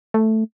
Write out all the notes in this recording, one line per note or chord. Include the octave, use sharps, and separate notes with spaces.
A3